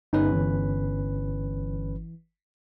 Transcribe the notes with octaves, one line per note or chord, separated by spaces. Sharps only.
G1 C#4 D#4 B4
E3